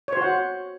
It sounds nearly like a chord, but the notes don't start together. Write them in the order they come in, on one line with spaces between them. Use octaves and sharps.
C#5 C5 F#4 F#5